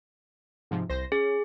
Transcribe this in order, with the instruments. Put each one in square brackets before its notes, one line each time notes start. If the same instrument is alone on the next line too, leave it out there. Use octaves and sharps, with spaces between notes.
[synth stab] G#2 C3 F3
C2 C5 A#6
[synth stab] C#4 [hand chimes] G#4